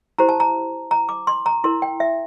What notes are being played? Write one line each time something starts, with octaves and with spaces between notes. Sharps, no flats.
E4 G4 C5 A#5
A5
A#5
A#5
D6
C6
A#5
E4 A#4 C6
G5
E5